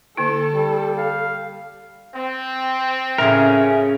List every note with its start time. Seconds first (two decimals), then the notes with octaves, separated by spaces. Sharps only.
0.17 D3 A#3 E4 A4
0.53 G3
0.98 F5
2.14 C4
3.18 A2 C#3 C#4 G#4 A#4 E5